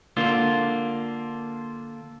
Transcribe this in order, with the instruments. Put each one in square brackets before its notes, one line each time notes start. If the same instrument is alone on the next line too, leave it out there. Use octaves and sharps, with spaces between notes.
[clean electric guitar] D3 A#3 D4 F4